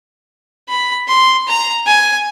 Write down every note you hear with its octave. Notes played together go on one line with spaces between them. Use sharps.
B5
C6
A#5
G#5